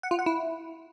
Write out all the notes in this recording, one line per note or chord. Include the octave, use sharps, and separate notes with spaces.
F#5
F4
F#5
E4